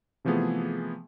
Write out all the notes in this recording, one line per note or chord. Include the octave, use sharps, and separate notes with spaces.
C3 E3 F3 A3 B3 G#4